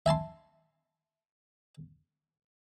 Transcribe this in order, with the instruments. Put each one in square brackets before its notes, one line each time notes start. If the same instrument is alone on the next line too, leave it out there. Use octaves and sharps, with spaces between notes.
[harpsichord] E5 G#5 A5 C6